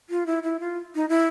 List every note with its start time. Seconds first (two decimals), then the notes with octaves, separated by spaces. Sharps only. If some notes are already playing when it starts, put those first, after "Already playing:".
0.10 F4
0.26 E4
0.43 E4
0.60 F4
0.95 D#4
1.09 E4